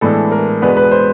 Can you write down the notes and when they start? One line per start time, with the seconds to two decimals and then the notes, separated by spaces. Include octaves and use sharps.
0.01 A2 E3 G#3 B3 D4 A4
0.32 A#4
0.62 E2 B2 G#3 B3 D4 B4
0.77 B4
0.92 C5